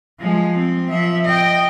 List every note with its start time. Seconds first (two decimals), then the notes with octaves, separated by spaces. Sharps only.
0.20 F3 G#3
0.57 C4
0.90 F3 E5
1.25 D#5 G5